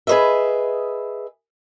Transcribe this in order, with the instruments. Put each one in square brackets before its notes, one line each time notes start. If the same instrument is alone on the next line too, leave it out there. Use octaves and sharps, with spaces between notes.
[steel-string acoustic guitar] G#4 B4 C5 D#5 E5